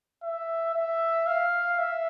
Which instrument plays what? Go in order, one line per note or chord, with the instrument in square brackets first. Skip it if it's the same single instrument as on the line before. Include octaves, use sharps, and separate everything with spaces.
[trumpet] E5
E5
F5
E5